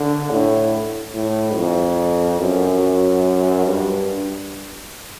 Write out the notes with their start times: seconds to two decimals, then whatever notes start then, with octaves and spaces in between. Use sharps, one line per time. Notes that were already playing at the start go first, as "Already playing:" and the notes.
Already playing: D3
0.30 A2
1.14 A2
1.56 F2
2.39 F#2
3.66 G2